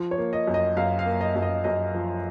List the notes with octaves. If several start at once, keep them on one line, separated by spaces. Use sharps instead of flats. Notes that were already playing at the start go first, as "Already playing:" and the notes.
Already playing: F3
C#5
A#3
D#5
F#2
D#5
F#2 F5
F5
A#3
D#5
F#2
D#5
F#2 D#5
F3